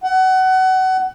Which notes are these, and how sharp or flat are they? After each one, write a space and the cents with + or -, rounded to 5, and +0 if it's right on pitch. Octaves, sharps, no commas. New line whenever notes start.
F#5 +25